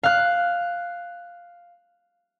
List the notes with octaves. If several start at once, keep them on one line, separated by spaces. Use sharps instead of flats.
F5 F#6